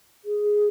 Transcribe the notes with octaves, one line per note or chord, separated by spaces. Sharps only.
G#4